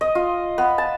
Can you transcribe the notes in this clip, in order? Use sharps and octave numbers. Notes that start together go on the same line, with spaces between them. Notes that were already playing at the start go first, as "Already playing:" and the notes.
D#5
F4
B3
A5